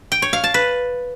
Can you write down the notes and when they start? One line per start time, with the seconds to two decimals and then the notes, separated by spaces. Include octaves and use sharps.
0.12 G5
0.22 C#5
0.33 F5
0.44 A5
0.54 B4